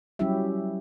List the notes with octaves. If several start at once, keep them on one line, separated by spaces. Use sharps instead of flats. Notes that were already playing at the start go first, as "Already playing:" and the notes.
F#3 G3 C#4 E4 G4 E5